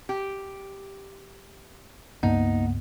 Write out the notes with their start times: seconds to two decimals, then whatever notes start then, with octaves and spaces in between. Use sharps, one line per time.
0.09 G4
2.23 C#2 G2 A#3 B3 D#4 F#5